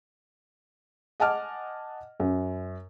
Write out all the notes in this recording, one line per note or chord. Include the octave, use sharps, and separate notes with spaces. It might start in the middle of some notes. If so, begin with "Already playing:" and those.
D#5 F#5 G#5 A5 D6 F6
F#2